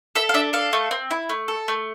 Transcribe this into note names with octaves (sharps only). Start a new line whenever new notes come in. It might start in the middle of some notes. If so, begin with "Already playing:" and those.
A4 E5
F5
D4 E5
A4 F5
A3
C4
E4
A3
A4
A3